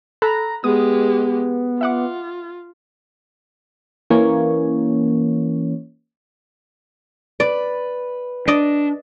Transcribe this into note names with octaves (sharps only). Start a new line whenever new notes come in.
A4 A#5 B5 F#6
G#3 B3 G4 D#6
F4 E5 F#5 D6
E3 A#3 C#4 C#5
B4 D5
D4 D5 D#5